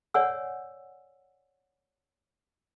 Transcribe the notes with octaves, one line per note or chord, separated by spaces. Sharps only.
C#5 D5 F#5 G#5 E6